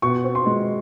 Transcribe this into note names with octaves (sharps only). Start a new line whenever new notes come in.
B2 C#6
C4
C6
G#3